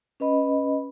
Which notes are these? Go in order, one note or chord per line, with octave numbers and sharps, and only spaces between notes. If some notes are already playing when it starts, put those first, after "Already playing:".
C#4 B4 D#5 B5